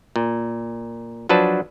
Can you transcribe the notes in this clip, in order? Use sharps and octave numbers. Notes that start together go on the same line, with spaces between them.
A#2
F3 F#3 D4 B4 A5